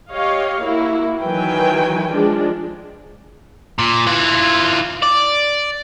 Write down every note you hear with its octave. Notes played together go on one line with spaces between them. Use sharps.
G4 C#5 D#5 F5
A#3 E4 F#4
D#3 E3 F#3 B4 G5 G#5
F3 G#3 D4
A#2
E3 F4
D5